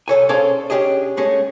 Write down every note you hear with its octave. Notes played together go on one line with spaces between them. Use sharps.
C2 A4 C#5 G#5
C#4 G#4 A4 C5 D5 F5
C#4 D4 G4 G#4 D#5
G#3 A3 C#4